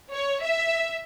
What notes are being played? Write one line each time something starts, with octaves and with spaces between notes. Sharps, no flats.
C#5
E5